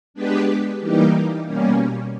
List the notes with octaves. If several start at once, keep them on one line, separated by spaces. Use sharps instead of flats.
G#3 B3 D4 G4 B4
E3 G3 A#3 D#4 G4
B2 G3 A#3 C#4